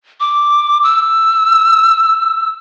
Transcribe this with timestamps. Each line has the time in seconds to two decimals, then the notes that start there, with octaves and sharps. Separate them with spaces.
0.20 D6
0.84 E6